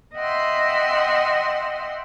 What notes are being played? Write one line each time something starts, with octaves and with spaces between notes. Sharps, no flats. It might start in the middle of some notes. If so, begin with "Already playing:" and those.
D#5 E5 F#5 G5 C6